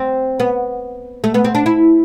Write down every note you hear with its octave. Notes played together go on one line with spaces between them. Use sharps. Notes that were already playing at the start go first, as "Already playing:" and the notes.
Already playing: C4
B3
A3
B3
C4
D4
E4